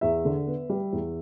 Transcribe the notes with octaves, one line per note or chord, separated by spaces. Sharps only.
E2 E5
D3
B3
G3
E2